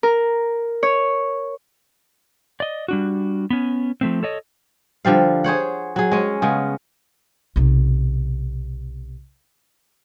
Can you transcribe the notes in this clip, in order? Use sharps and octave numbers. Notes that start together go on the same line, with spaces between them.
A#4
C#5
D5 D#5
G3 D4 F#4
B3 C#4
F3 A3 C4
A4 C#5 D#5
D3 F3 G3 F5
G#4 C5 C#5 F#5
F#3 G#4
G#3 C#4
C#3 G#3 B3
B1 C3